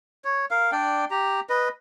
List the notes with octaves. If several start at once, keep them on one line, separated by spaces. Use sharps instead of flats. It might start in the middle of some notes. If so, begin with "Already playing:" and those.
C#5
A#4 F5
D4 D5 G5
G4 A#5
B4 D#5